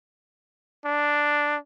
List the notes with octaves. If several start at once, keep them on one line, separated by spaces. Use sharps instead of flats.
D4